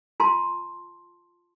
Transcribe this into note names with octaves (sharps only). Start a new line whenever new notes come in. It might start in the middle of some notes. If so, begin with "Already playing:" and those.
F4 A5 C6